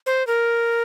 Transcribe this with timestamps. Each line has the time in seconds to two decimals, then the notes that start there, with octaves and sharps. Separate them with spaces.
0.06 C5
0.27 A#4